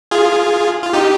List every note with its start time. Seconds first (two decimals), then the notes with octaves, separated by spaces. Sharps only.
0.11 F4 G#4
0.83 F4
0.93 D#4 G4